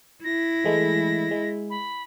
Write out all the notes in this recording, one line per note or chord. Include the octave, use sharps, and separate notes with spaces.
E4 A#6
E3 G#3 A3
G#3
B5